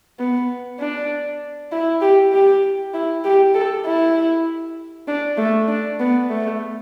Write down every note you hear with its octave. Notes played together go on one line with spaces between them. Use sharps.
B3
D4
E4
G4
G4
E4
G4
A4
E4
D4
A3
D4
B3
A3